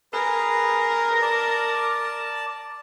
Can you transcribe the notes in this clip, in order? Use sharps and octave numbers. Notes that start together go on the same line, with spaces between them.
G#4 A#4 B4
D5 A5